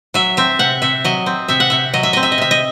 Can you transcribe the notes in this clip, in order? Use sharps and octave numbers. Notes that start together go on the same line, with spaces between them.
F#3 E5
C4 E5
C3 F#5
C3 E5
F#3 D#5
C4
C3 E5
F#5
C3 E5
F#3 D#5
E5
C4 D#5
E5
D#5
C3 E5
D#5